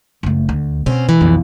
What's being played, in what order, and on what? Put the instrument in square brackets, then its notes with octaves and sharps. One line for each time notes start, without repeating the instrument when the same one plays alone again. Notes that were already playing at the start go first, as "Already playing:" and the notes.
[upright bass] F#1 A3
D2
[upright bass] B2 [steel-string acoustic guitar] C4 C#4
[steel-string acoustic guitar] E3
[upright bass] B1 F2